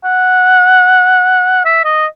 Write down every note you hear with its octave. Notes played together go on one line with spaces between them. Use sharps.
F#5
E5
D#5